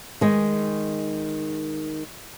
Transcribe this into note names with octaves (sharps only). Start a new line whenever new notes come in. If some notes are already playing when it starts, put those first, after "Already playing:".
D#3 G#3